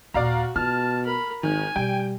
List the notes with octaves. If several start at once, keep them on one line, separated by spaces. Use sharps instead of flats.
D#2 A#2 F#4 D5 F5 A#5
B2 F4 A5 F6
A#4 B5
G#1 D#3 G#5
B2 G3 G5